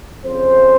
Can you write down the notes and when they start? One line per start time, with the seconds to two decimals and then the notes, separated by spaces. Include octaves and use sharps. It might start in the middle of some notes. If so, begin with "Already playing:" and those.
0.24 F2 C#3 C5